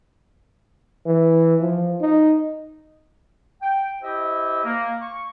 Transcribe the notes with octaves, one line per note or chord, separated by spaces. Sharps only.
E3
F3
D#4
G5
E4 G4 C5 D#5 E5
A#3
C#6